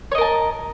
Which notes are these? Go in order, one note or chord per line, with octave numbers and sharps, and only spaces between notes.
A#4 C#5 D#5 A5